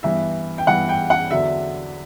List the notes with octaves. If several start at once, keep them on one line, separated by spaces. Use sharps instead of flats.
G2 E3 B3 E5
G5
G2 E3 B3 F#5
G5
F#5
E2 D3 F#3 E5